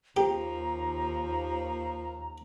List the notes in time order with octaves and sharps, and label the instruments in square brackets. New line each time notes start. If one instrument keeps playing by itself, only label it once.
[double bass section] D#2 [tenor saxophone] F3 [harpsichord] G4 [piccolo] A#5